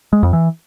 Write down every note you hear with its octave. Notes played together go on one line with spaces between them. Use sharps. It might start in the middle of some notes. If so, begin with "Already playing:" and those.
G#3
F2
E3